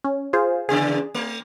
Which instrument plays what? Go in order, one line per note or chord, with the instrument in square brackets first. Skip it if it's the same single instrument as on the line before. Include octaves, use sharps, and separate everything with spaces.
[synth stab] C#4
F4 G#4 C5
[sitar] E2 C#3 D5 [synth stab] G#4
[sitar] A3